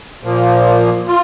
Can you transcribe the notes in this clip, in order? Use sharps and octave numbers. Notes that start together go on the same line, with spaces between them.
A#2 F3 A#3
F4